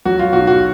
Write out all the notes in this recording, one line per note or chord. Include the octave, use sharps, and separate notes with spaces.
F#3 F#4
F4
B1 F#4
F#4